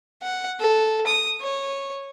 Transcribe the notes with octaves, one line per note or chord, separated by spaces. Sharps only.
F#5
A4
D#6
C#5